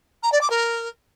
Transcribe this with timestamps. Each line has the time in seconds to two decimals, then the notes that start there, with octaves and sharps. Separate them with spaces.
0.23 A#5
0.32 D5
0.41 D6
0.50 A#4